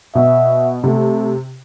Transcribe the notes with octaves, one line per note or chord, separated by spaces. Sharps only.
B2 E5
C3 A3